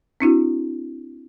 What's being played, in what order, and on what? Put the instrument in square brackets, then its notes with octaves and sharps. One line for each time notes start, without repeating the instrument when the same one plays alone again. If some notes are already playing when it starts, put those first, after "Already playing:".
[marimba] C4 D4 E4 F#4